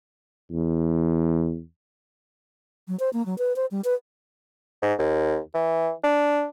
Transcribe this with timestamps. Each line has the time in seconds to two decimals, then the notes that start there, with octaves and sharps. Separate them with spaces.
0.51 E2
2.88 F#3
2.99 C5
3.13 A#3
3.26 F#3
3.38 B4
3.56 C5
3.71 G3
3.84 B4
4.82 G#2
4.99 D#2
5.54 E3
6.04 D4